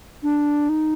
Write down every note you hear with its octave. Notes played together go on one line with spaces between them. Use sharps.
D4
D#4